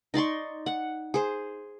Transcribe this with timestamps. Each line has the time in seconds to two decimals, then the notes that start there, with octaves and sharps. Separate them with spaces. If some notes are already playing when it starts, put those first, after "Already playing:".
0.14 D#4 D5 C6 C#6
0.66 F#5
1.14 G#4 C5